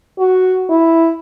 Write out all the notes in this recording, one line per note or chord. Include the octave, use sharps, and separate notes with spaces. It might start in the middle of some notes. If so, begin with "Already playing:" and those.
F#4
E4